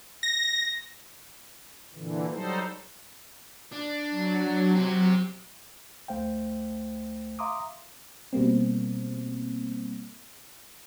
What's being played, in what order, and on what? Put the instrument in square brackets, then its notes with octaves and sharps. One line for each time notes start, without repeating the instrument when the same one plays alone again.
[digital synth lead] A#6
[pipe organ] A#2 D3 E3
F#3 G3 D#4 A4 C5
[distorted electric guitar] D4
[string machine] F#3
[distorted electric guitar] C4 G4
[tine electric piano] G1 D2 A3 C5 F5 G5
E5 F5 A#5 C6 D6 D#6
[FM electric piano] B2 G3 A#3 C4